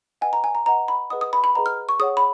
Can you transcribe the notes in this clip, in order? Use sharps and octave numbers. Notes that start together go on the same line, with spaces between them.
B4 D#5 F#5 G#5
A#5
G#5
A#5
B4 D#5 F#5 A#5
B5
G#4 B4 D#5 F#5 D#6
D#6
B5
B5
G#4 B4 D#5 F#5 A#5
F6
C#6
G#4 C#5 F#5 D#6
B5